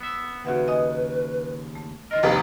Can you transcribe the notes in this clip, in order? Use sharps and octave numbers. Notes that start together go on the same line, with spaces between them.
B3 E5
D#2 C#3 F#4 B4 E5 F#5
D#5 G#5 D#6
A3
D#3 F4 A#4 D#5
F1 D#2 D4 B4